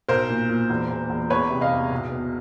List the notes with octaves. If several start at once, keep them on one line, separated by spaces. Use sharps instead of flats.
B1 A#4 C5
A#2
A#2
E1
E1
E1
E2 B4 C#5
C3
D#5 F5
E2
B1
B2